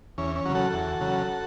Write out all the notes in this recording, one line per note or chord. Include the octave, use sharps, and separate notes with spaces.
E2 C#4
C#4
C#3 F#3
F#4 A4
E2
C#3 F#3